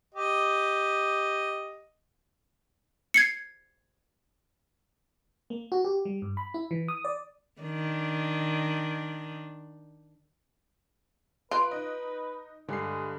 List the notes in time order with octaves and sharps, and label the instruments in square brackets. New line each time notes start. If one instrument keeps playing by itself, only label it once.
[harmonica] G4 D#5
[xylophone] G#6 C7 C#7
[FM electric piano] A#3
F#4
G4
G3
G2
B5
E4
E3
D#6
D5
[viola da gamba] D#3 D4
[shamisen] F4 [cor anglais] B4 [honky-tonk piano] F#6 D7
[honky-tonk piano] D#4 D#5
[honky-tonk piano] G2 C7 [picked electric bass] D3 [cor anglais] G#3